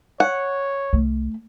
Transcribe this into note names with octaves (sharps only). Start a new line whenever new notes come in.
C#5 F#5
C2 A3